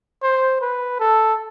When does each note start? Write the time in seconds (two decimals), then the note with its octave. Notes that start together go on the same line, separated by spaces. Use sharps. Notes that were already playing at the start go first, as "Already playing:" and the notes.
0.23 C5
0.61 B4
1.00 A4